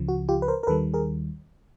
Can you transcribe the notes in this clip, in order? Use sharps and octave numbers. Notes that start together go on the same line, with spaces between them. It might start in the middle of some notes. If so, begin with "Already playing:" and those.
Already playing: C#2 C#3 F3
F#4
F4 G4
B4
A#4 C5
A#4
D#2 D#3 G3 A4 B4
G#4 A#4